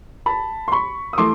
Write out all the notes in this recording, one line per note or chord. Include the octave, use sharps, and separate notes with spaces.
A5 B5
C6
B5 C#6
D#6
E3 A3 C6 D6